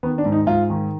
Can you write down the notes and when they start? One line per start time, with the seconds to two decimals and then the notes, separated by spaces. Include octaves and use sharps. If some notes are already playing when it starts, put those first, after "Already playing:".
0.03 D#3 B3
0.18 D4
0.25 G#2
0.32 D#4
0.47 G#2 F4
0.70 D#3